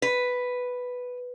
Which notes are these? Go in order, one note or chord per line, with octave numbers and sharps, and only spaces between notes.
B4